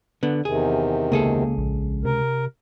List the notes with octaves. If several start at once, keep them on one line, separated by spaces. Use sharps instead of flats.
D3 B3
E2 C3 D#3 G#4
C#2 A#3 G#4 A4
A#1
C3 A#4